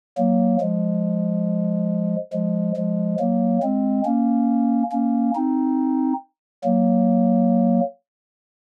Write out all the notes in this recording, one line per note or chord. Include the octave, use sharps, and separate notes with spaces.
F#3 A#3
F3 G#3
F3 G#3
F3 G#3
F#3 A#3
G#3 C4
A#3 C#4
A#3 C#4
C4 D#4
F#3 A#3